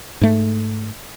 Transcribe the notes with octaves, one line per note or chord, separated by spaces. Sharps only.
G#2 A3